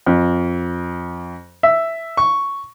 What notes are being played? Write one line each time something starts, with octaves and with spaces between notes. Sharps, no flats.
F2
E5
C#6